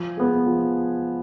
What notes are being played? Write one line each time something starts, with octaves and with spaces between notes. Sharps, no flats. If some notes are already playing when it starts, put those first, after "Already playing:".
Already playing: F3 G#5
G#3 B3
F3